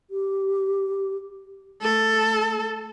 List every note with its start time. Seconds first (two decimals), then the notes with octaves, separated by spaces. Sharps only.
0.10 G4
1.82 A3 A4